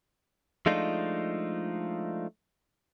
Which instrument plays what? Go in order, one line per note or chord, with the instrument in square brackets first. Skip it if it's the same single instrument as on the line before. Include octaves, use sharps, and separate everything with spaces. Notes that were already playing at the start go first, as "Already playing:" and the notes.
[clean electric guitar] F3 G#3 A3 D4 D#4 F4